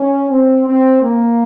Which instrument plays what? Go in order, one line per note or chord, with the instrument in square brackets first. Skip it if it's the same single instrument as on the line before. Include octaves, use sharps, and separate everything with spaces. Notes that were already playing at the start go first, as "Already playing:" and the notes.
Already playing: [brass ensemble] C#4
C4
C4
A#3